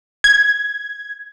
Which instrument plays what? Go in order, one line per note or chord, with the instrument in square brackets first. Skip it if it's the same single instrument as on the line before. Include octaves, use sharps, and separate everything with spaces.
[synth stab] G#6